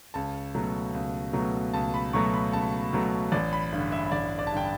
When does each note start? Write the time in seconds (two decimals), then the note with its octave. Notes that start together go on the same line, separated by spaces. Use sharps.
0.14 C#2 A5
0.55 B2 F#3 A3
0.94 C#2
1.33 B2 F#3 A3
1.73 C#2 A5
1.94 B5
2.13 B2 F#3 A3 C#6
2.34 B5
2.53 C#2 A5
2.93 B2 F#3 A3
3.32 A1 D5
3.53 B5
3.73 G2 D3
3.92 E5
4.12 A1 D5
4.39 D5
4.47 A5
4.52 G2 D3 G5